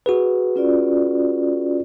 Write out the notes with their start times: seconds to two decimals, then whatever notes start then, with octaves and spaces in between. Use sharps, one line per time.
0.06 F#4 G#4 B4
0.56 C#4 F4 D5